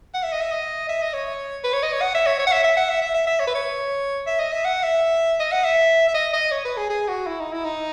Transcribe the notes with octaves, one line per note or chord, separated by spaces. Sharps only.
F#5
E5
D#5
E5
D#5
E5
D#5
C#5
B4
C#5
D#5
C#5
F#5
E5
C#5
C#5
F#5
E5
E5
F#5
E5
E5
E5
E5
C#5
B4
C#5
E5
D#5
E5
F#5
E5
D#5
F#5
E5
E5
D#5
D#5
C#5
B4
G#4
G#4
F#4
E4
D#4
E4
D#4